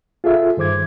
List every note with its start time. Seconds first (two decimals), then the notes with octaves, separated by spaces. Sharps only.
0.24 F4 G#4 A4 E5
0.57 G2 D#3 C5 D6 G#6